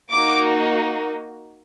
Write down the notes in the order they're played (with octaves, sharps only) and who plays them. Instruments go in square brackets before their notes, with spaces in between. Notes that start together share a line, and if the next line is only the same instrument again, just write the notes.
[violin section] A#3 D#4 F#4 D6